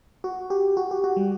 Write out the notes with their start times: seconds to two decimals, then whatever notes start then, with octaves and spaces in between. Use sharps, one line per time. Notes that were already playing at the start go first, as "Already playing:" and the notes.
0.24 F#4
0.50 G4
0.77 F#4
0.91 G4
1.04 F#4
1.16 G3